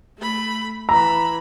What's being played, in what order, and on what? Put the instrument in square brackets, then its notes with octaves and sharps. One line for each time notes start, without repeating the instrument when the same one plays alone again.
[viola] A3 B5
[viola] E3 B5 [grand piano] A#5